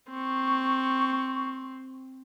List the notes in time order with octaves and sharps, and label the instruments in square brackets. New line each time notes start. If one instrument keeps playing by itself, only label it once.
[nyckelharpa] C4 [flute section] C#6